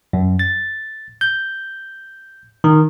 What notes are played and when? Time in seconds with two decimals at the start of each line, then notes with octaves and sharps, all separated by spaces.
0.13 F#2
0.39 A6
1.21 G6
2.64 D#3